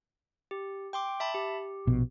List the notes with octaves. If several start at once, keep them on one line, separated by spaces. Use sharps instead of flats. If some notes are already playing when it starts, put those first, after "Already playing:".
G4
G5 C6 D6
E5 A5 B5
G4
A#1 B2